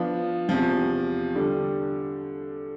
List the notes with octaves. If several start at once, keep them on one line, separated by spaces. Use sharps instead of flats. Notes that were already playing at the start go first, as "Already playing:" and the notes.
Already playing: F3 B3 D4 F4
E2 C3 F3
D3 G3 D4